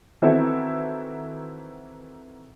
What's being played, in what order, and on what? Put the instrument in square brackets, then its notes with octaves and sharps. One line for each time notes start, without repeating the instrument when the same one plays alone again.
[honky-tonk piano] D#3 E3 C4 E4 F#4 A4